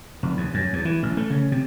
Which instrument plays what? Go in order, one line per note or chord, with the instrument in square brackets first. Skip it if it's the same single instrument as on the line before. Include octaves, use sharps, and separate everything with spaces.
[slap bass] F1
D#2
F#2
E2
E3
A1
A3
C#3
C3